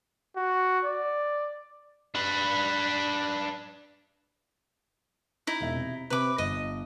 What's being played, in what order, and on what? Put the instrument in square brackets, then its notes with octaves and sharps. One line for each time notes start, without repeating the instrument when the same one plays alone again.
[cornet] F#4
D5
[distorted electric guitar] D4 B4
[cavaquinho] D#4 E4
[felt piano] E1 E5
C3
[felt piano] C3 C4 [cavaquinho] B4 D6
[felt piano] G1 [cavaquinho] D#5